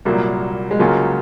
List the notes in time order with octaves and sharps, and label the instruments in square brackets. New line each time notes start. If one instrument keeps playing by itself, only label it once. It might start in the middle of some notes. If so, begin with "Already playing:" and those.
[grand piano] C2 A#2 F#3 [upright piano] A#3
[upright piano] G#3
[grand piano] C#2 C#3 F#3 C#4 F4 [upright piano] A#3